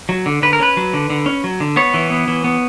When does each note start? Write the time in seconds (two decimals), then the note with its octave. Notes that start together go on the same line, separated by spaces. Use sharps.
0.09 F#3
0.26 D3
0.42 D3 B4
0.53 A#4
0.60 C#4 B4
0.77 F#3
0.94 D3
1.10 D3
1.26 C#4
1.44 F#3
1.60 D3
1.76 B3 C#5
1.94 E3
2.10 B3
2.28 E3
2.44 B3